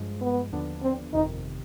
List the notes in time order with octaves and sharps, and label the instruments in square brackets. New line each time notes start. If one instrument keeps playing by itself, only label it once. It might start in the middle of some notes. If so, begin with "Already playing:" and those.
Already playing: [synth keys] G2 F3 G#3
[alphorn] B3
[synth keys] D#2 D3 F3 B3 D4
[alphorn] C4
[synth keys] G1 F2 C3 D#3 [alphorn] D#4